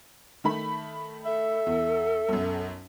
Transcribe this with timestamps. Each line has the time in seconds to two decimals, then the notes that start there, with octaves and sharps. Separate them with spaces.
0.44 D#3 A3 B5
1.26 A4 E5
1.66 E2
2.29 B1 F#2